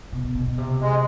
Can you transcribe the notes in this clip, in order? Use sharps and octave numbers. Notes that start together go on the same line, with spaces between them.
B2
B2
C3
G#3